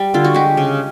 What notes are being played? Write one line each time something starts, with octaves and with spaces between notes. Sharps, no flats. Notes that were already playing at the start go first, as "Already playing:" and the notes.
Already playing: G3
D3 F4
F#4
G#3 G4
C#3